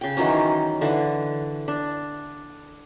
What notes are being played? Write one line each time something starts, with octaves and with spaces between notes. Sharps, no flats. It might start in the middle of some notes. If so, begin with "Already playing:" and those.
C#3 G5
D#3 E3 F#3 C#4
D3 E3
D4